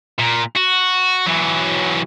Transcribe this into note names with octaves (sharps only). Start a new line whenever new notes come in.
A#2
F#4
E3 F#3